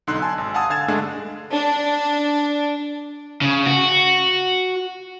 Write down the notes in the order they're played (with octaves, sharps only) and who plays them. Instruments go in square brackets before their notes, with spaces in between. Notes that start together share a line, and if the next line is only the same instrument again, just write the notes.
[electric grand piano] B1 D3 D#4 C6 E6 F#6
G#5 A5 C6
G#1
F5 F#5 G#5 A5 D#6 E6
D3 F5 G#6 A6 E7
G2 D3 G#3 A3 D4
[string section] D4
[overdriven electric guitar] C#3
F#4